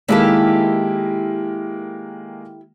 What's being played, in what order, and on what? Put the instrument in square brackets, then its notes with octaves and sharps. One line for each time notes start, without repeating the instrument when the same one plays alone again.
[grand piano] D#3 G#3 A#3 [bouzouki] E4 G4 A4